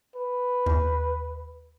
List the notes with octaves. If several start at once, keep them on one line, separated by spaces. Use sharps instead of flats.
B4
D#2